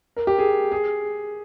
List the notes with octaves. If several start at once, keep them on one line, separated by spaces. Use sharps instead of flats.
A#4
G4
G#4
G#4